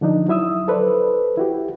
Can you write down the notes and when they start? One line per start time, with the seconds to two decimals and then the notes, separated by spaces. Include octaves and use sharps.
0.01 D3 F3 D4 D#4
0.28 F#3 E4 E5 D#6 E6
0.68 A4 B4 C5 D5
1.37 E4 F#4 G4